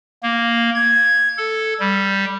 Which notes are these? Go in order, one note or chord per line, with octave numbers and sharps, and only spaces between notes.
A#3
G#6
A4
G3